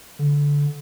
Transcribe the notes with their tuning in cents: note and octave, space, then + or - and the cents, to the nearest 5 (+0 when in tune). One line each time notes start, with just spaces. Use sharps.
D3 -20